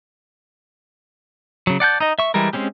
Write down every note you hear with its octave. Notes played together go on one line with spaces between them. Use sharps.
C#3 F#3
D5 F#5 A5 G6
D#4 D#5
E5 C#6
E3 G3 G#3 A#4
G#3 C4 C#4 G4